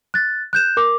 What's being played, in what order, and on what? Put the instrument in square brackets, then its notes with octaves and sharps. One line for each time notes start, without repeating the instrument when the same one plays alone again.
[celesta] F#6 A6
F#6 G6 E7
A#4 D6